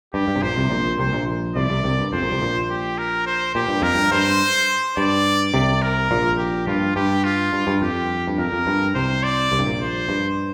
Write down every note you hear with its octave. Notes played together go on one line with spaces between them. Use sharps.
G2 G4
G2
C3
A#1 A#2 C5
C2 C3
A#1 A#2
C2 C3 C5
A#1 A#2
C2 C3 D5
C2 C3
C2 C3
G2
F2 C5
A#1 A#2
C2 C3
A#1 A#2
G4
A#4
C5
A#2 G4
G2
F2 A#4
G2
G2 C5
G2 D5
C2 C3 D5
A#4
A#1 A#2
G4
G2 F4
G2 G4
F4
G2
G2
F2 G4
G2
F2 A#4
F2
G2
C2 C3 C5
D5
C2 C3
G2
A#1 A#2
C5
G2